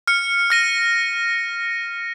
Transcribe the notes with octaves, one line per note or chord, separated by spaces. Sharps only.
F6 C#7
F6 A#6 D#7